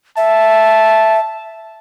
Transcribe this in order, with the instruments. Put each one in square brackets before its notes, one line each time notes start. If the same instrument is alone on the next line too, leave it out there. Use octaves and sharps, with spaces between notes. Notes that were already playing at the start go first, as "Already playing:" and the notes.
[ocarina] E5 [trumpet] A5